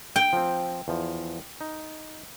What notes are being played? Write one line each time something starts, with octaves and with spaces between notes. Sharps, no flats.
G5
F3 C4
E2 F3
D#4